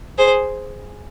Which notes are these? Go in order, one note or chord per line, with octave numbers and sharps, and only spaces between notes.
G#4 C5